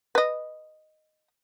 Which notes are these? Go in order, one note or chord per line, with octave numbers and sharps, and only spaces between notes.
B4 D#5